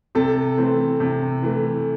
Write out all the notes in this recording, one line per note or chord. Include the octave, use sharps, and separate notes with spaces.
C3 A4
E3 A3 C4
C3
E3 A3